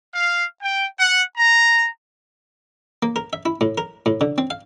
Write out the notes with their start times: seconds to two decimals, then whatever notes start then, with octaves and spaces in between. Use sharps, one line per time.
0.13 F5
0.61 G5
0.98 F#5
1.37 A#5
3.03 A#3
3.16 A#4
3.33 E5
3.46 E4
3.61 A2
3.78 A#4
4.06 A2
4.21 D3
4.38 C4
4.50 F5